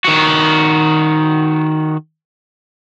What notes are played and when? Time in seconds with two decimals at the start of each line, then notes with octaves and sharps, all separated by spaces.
0.05 D#3 F#4